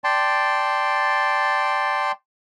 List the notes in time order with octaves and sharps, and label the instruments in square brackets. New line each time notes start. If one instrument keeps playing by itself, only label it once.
[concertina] D5 G5 A5 C6